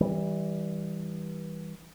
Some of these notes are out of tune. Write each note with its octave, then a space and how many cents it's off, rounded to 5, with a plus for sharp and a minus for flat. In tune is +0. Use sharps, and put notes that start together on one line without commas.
E3 -25 G3 +0